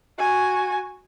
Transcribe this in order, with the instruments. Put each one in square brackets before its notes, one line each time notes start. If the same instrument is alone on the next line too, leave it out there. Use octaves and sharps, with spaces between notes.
[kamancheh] F#4 G#5